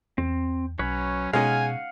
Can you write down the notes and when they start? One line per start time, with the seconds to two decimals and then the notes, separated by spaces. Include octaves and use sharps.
0.18 E2 C4
0.79 B1 F#3 C#4 B4 C#5
1.33 B2 G#3 C#4 D#4 F5 F#5 G#5